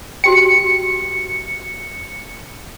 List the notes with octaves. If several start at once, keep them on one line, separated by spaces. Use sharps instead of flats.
F#4 G4 G5 C#7